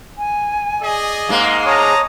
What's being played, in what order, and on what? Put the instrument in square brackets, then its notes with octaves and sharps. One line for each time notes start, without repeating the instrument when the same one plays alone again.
[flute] G#5
[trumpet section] G#4 D5 D#5
[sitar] G#2 G#3 A#3 [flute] F5
[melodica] C#5 D#6 [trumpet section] A5 A#5